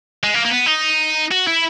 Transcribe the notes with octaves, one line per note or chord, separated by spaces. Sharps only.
G#3
A#3
A#3
B3
D#4
F#4
E4